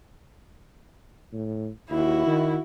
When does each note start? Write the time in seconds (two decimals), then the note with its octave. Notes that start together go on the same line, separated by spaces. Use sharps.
1.32 A2
1.90 D#2 E4 F#4
2.27 D#3